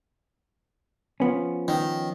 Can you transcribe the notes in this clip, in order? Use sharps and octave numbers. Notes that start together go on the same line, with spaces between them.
F3 B3 C#4
D#3